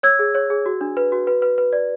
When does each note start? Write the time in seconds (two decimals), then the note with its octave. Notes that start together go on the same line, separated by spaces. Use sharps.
0.03 C#5 E6 G#6
0.19 G#4
0.35 C#5
0.50 G#4
0.66 F#4
0.81 D4
0.97 B4
1.12 F#4
1.27 B4
1.42 B4
1.58 B4
1.73 D5